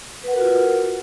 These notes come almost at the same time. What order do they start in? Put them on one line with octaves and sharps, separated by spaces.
B4 F#5 A#4 F#4 F4